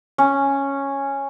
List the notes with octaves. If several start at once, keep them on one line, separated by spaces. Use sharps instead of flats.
C#4